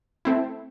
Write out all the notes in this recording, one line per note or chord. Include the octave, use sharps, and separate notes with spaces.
A3 C4 E4